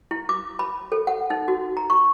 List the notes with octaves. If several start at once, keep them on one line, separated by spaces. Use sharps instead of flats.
E4
D6
B5
A4
F#5
D#4
F#4
A#5
C#6